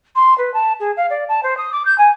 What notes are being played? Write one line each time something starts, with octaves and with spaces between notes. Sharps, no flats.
C6
B4
A5
G#4
F5
D5
A5
C5
D#6
D6
G6
G#5